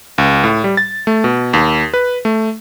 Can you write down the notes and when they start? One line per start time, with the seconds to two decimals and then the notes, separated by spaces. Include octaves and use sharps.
0.18 C#2
0.44 A2
0.64 G3
0.77 A6
1.07 A3
1.24 B2
1.53 D#2
1.94 B4
2.25 A3